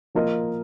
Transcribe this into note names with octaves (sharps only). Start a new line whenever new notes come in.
F3 A#3 F4 A#4 D#5